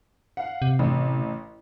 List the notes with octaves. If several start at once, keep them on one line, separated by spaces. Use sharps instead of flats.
F5 F#5
C3
A1